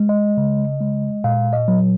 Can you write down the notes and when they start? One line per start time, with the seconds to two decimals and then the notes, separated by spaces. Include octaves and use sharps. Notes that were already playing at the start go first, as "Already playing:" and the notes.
Already playing: G#3
0.09 D#5
0.37 C#3
0.81 G#3
1.24 A#2 F5
1.53 D#5
1.68 F#3